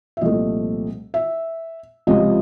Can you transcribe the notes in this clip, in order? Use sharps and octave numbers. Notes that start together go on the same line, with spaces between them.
E5
C2 A#2 F3 A3 D#5
E5
C#2 C3 F3 D#5